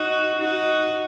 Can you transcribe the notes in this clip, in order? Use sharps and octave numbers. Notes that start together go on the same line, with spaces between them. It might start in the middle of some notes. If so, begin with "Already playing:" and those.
Already playing: D#4 F#4
D#4 F#4